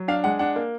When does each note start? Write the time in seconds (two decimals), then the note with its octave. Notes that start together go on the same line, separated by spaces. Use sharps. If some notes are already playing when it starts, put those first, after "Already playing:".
Already playing: F#3
0.08 D4 F5
0.24 G#3 F#5
0.39 D4 F#5
0.56 A#3